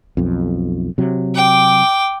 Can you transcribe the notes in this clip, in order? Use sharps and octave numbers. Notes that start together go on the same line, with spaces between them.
B1 F2
C3 F#3
G5 D6